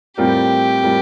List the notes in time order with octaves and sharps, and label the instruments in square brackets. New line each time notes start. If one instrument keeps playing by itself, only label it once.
[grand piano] A2 G3 C4 F4 A#4 [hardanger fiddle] G4
[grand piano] A2 G3 C4 F4 A#4